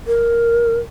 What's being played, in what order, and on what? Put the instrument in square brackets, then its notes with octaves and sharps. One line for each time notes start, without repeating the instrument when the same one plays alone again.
[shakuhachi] A#4